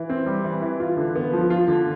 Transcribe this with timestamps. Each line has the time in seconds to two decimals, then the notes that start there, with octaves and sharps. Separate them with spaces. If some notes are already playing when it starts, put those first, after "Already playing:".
Already playing: E3
0.10 C4
0.26 G3
0.44 E3
0.62 E3
0.80 F4
0.97 D3
1.15 B3
1.33 F3
1.50 F4
1.68 D3